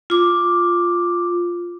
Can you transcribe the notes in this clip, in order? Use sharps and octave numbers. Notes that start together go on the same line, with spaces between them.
F4 D6